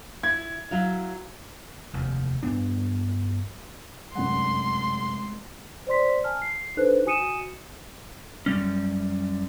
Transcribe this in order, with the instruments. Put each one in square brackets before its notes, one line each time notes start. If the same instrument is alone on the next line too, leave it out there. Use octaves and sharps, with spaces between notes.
[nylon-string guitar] E4 [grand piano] G#6
[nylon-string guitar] F#3 E4 F5
[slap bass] F1 D#2
G2 B3 D4
[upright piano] F1 F#2 F#5 [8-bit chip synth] G#3 [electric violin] C6
[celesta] C5 D5 C6 B6
G#5 A5 F6
C7
D4 D#4 A4 B4 C5 F#6
F#4 G#5 D#6 C#7 D#7 E7
[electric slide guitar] F#2 B2 G3 C#4